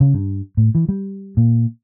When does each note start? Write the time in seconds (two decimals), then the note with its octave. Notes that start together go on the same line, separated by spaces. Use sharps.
0.01 C#3
0.14 G2
0.57 A2
0.75 E3
0.89 G3
1.37 A#2